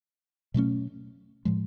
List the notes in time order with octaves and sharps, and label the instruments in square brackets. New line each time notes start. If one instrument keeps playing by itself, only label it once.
[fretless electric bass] B2 F#3 A3 C#4
A2 F3 G#3